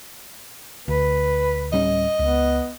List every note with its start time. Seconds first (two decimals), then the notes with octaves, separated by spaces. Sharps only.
0.88 D2 B4
1.73 D1 G3 C#4 D#5
2.19 C#2 B3